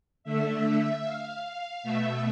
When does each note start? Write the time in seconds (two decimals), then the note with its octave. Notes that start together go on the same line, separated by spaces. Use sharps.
0.24 D3 A3 E5
1.04 F5
1.83 B2 A3 E5